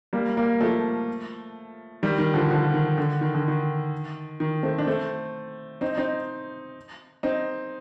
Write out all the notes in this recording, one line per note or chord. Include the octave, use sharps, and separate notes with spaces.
G3 A#3
G3 A#3
F3 A3
D#3 G3
D#3
D3 F3
D3 F3
D#3
D3
D#3
D3
D#3
D#3
A3 C4
D4
A3 C4
C4 D#4
C4 D#4
C4 D#4